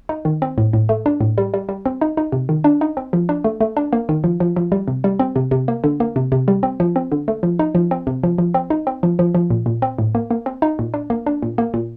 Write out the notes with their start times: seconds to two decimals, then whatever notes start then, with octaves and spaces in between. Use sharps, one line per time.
0.09 D#4
0.25 D#3
0.42 C4
0.58 A2
0.73 A2
0.89 A3
1.06 D4
1.21 A2
1.38 G3
1.54 G3
1.69 G3
1.86 C4
2.01 D#4
2.17 D#4
2.32 C3
2.49 D#3
2.64 D4
2.81 D#4
2.97 C4
3.13 F3
3.29 D4
3.44 A3
3.61 A3
3.77 D4
3.93 A#3
4.09 D#3
4.24 F3
4.40 F3
4.56 F3
4.72 G3
4.88 C3
5.04 G3
5.19 C4
5.36 C3
5.51 C3
5.68 A#3
5.84 D3
6.00 A#3
6.16 C3
6.32 C3
6.48 G3
6.63 C4
6.80 F3
6.96 C4
7.12 D3
7.28 A3
7.43 F3
7.59 D#4
7.75 F3
7.91 C4
8.07 C3
8.24 F3
8.38 F3
8.54 C4
8.70 D#4
8.87 C4
9.03 F3
9.19 F3
9.35 F3
9.50 A#2
9.66 A#2
9.82 C4
9.99 A2
10.15 A#3
10.31 A#3
10.46 C4
10.62 D#4
10.79 A#2
10.94 D4
11.10 A#3
11.26 D4
11.43 A#2
11.58 A#3
11.74 A#2